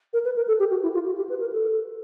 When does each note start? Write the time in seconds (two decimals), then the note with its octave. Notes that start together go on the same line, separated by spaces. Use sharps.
0.13 A#4
0.25 B4
0.36 A#4
0.48 A4
0.59 G4
0.71 F#4
0.83 E4
0.94 F4
1.06 F#4
1.18 G4
1.29 B4
1.40 A#4
1.53 A4